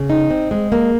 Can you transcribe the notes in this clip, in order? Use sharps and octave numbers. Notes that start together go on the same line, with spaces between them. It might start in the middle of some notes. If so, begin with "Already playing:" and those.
Already playing: C#3
D#4
C4
G#3
A#3